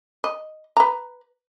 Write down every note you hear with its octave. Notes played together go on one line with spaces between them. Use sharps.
D#5
B4 A#5